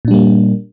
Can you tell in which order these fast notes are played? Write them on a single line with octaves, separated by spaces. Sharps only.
A#2 D4 G3 A#3